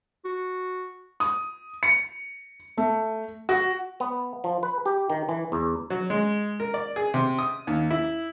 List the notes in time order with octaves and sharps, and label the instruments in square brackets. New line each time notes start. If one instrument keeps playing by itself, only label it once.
[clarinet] F#4
[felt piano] D#6
C#7
A3
F#4
[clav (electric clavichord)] B3
F3
B4
G4
D#3
E3
E2
[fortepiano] F#3
G#3
A#4
D5
G#4
C3
D#6
D#2
E4